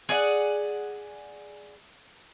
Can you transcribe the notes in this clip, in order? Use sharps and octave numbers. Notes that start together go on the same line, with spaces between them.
G#4 D5 D#5 F#5